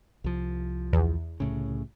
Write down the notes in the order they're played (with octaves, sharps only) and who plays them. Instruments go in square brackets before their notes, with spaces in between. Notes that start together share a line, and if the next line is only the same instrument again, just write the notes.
[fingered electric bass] C2 F3
[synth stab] E2
[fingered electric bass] C2 A2 C#3